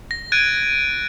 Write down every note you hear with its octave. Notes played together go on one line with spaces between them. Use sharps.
A#6
F#6 G#6 A6 D7 D#7